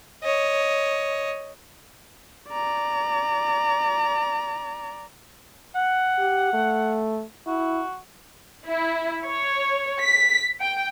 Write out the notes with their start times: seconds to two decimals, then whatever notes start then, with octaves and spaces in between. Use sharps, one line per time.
0.24 C#5 D#5
2.49 D5 A#5
5.75 F#5
6.18 G4
6.53 A3
7.47 E4 F#4
8.68 E4
9.27 C#5
10.03 B6
10.60 G5